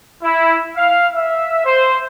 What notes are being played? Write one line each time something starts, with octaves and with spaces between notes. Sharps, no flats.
E4
F5
E5
C5